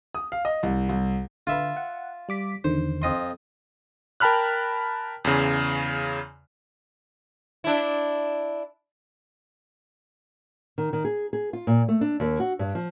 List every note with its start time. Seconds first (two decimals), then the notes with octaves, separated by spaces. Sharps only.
0.15 D#6
0.32 F5
0.45 D#5
0.63 C2
0.89 C2
1.47 D3 F4 B4 E5
1.77 F#5
2.29 G3 D6 B6
2.64 E2 D3 D#3 C5
3.02 F2 D#5 C6
4.20 A#4 G5 A5 B5 F6 F#6
5.25 E2 C#3
7.64 D4 E4
10.78 D#3
10.93 D#3
11.05 G#4
11.33 G#4
11.53 F4
11.67 A#2
11.89 A3
12.01 D4
12.20 D#2
12.40 F#4
12.59 G2
12.75 F3